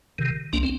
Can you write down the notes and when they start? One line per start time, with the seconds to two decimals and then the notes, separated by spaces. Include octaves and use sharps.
0.18 C3 D#3
0.53 C2 A#3 D4
0.63 C4